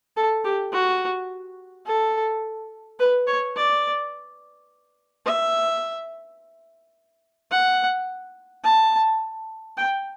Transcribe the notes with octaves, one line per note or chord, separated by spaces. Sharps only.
A4
G4
F#4
A4
B4
C#5
D5
E5
F#5
A5
G5